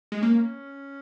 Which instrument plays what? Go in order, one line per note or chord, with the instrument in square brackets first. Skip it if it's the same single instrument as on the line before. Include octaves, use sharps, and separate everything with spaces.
[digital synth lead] G#3
[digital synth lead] A#3 [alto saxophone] C#4